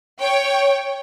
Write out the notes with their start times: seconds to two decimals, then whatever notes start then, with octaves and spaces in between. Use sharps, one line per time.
0.19 C#5 G5